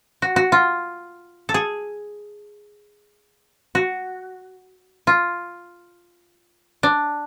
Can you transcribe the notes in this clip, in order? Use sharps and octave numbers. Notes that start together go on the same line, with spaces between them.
F#4
F#4
F4
A4
G#4
F#4
F4
D4